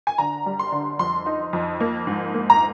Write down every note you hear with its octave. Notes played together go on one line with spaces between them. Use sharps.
G#5
D3 A#5
G3
C6
D3
F2 C6
D#4
F2
A#3
G#2
A#3
A#5